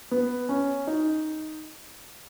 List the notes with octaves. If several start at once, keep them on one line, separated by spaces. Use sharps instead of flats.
B3
C#4
D#4